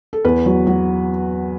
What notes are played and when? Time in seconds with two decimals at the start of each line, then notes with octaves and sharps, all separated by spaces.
0.13 A4
0.24 E2 B4
0.46 F#3
0.67 F#3